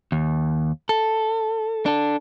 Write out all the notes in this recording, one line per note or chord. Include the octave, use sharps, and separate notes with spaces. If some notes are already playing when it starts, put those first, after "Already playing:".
D#2
A4
D4 A4